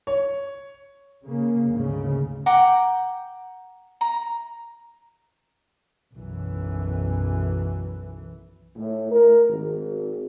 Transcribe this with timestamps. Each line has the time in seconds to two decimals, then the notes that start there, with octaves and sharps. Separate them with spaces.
0.07 C#5
1.25 C#3 A#3
1.69 D2 G#2 C#3
2.46 F#5 G5 A#5 D6
4.01 A#5
6.13 B1 F#2 E3
8.76 A2
9.11 A#4
9.49 G#1